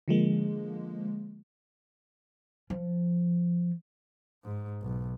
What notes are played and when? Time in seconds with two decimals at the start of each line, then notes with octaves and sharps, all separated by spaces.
0.08 D3 F3 G#3 A#3
2.70 F3
4.45 G#2
4.82 B1